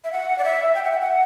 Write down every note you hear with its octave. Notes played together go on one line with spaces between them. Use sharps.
E5
F#5
D5
E5
G5
F#5
E5
F#5